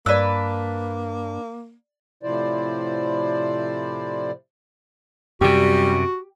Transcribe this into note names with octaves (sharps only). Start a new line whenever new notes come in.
G2 A#3 D4 B4 D5 E6
A2 C3 F3 E4 C5 D5
F#2 C3 G3 F#4 G4